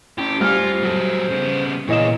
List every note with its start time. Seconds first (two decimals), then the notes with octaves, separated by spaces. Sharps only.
0.18 C#4 E4 G4
0.41 G3 F4 C5 G#5 F6
0.83 F#3 A4
1.31 C#3 B3
1.89 A#2 E3 G#4 C#5 D#5 E7